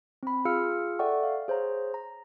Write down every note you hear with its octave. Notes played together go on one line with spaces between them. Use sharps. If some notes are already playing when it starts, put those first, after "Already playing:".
C4 B5
F4 G#4 F5 E6 F6 C#7
A4 D5 E5 F#5 G5 C#6
F5
G#4 C5 C#5 A#5
A#5